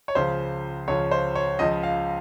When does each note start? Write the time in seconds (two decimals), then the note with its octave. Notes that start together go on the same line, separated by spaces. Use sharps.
0.08 C#5
0.15 C#2 C#3 F3 C5
0.88 C#2 C#3 F3 C#5
1.11 C5
1.35 C#5
1.59 C#2 C#3 F3 D#5
1.83 F5